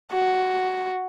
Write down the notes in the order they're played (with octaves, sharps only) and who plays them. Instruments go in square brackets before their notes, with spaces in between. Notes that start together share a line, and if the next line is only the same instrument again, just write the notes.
[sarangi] F#4